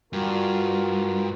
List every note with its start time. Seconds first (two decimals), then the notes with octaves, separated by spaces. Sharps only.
0.13 G2 F4 F#4 A#4